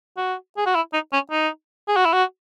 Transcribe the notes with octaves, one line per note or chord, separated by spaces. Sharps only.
F#4
G#4
F#4
E4
D#4
C#4
D#4
G#4
F#4
E4
F#4